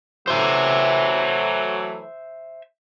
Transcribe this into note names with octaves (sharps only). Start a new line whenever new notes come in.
E3 F#3 A3 C5 E5